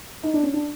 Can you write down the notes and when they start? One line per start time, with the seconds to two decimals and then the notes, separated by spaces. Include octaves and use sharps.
0.23 D#4
0.34 D4
0.43 C#4
0.53 D4